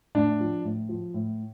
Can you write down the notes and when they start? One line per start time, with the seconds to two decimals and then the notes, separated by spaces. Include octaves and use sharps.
0.15 A2 D4
0.40 F3
0.64 A2
0.89 F3
1.14 A2